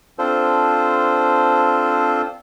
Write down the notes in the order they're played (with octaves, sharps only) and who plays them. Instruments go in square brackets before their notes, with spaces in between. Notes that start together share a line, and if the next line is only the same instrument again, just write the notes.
[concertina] C4 D4 F4 A4 C5